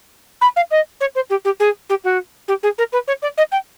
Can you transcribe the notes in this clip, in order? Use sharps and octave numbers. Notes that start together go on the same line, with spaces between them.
B5
F5
D#5
C#5
C5
G4
G4
G#4
G4
F#4
G4
G#4
A#4
B4
C#5
D5
D#5
G5